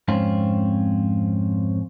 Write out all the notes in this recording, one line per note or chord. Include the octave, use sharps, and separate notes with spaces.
F2 G#2 C4 C#4 F4